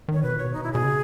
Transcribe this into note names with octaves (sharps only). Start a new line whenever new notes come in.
D#3 C#5
B2 B4
A#2
B2 C#5
D#4
E4
B2 G#4
C#3